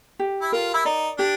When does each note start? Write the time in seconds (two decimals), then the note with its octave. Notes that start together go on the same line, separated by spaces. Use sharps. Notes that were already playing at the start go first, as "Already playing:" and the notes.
0.19 G4
0.42 E4
0.52 F4 A#4
0.74 E4
0.85 D#4 D5
1.18 D4 G4